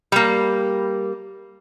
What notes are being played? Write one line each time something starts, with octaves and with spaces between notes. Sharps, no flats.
G3 A#3